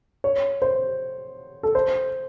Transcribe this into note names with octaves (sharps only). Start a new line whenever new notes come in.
C#5
C5
A4
C5